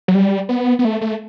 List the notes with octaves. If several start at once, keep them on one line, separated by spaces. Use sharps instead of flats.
F#3
G3
B3
B3
A3
A3